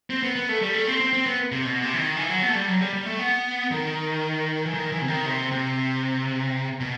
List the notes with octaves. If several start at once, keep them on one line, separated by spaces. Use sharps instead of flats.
C4
B3
B3
A3
G3
A3
C4
C4
C4
B3
C3
B2
C3
E3
D#3
E3
F#3
B3
A3
G3
F#3
G3
G3
A3
B3
D#3
E3
D#3
E3
C3
D#3
C3
C3
B2